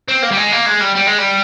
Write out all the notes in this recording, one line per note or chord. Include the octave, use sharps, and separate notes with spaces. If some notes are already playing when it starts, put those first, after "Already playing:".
C4
A#3
G3
G#3
A#3
G#3
G3
G3
G#3
G3